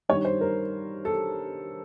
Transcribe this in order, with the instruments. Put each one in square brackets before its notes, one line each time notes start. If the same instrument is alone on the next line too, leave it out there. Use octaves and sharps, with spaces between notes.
[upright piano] G2 D#3 G3 C#5
C5
A#4
A4